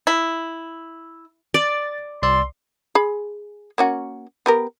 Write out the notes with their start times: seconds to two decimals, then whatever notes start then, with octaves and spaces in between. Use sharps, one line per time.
0.07 E4
1.54 D5 A6
2.23 C2 D5 C6 E6
2.95 G#4 B5
3.78 A#3 C#4 F#4
4.46 B3 G4 A#4